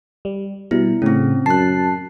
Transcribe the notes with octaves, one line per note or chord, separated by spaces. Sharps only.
G3
B2 G3 E4
A2 C#3 C4 C#4
F#2 A5 F#6 C7